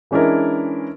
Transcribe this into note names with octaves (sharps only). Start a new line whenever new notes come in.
E3 G#3 C#4 D4 E4 A#4